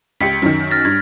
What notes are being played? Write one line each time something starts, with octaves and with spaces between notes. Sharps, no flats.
C#2 G4 B6 C#7
F#2 D#3
F6 A6 A#6
G2 G#6